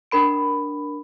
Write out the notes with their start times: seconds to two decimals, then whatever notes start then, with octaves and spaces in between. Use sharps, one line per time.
0.11 D4 A#4 B5 D7